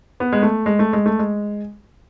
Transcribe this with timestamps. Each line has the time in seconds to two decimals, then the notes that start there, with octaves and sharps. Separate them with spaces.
0.20 B3
0.33 G#3
0.42 A3
0.66 G#3
0.79 A3
0.93 G#3
1.06 A3
1.19 G#3